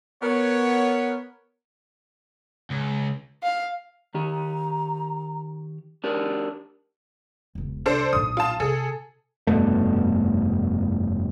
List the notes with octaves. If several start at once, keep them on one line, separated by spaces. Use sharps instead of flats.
B3 A#4 C#5
C#2
F5
D#3 G4 A#5
D4 D#4 G4 A#4
E1 C#2
C2 D4 A4 C5
B1 A#2 D#6
F4 A5
C3 D4 G#4 A4
F1 G2 B2 A3